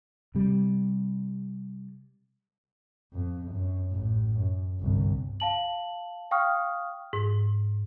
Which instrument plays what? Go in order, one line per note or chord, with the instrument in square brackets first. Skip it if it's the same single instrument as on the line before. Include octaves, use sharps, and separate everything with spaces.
[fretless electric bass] C3 G3
[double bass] F2
F#2
A1
F#2
G1 C2
[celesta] F5 A5 F#7
F5 G5 C#6 D#6 F6
[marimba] G#2